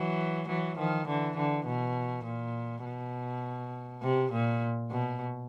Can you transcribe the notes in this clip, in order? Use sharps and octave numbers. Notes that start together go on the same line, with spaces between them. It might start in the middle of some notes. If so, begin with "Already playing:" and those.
Already playing: E3 F#3
E3 F#3
D#3 F3
D3 E3
D3
B2
A#2
B2
C3
A#2
B2